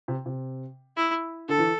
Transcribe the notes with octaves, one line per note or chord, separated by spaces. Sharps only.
C3
C3
E4
D3 A4
E3